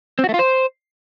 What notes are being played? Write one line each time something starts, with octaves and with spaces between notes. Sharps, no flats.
C4
F#4
A3
F4
C5